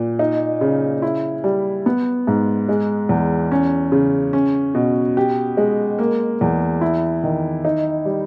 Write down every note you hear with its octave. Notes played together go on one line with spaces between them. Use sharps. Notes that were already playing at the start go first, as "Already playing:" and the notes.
Already playing: A#2
D#4
C#3
E4
G3
B3
G#2
G#3
E2
C#4
C#3
C#4
B2
G4
G#3
A#3
E2
E4
D#3
D#4
G3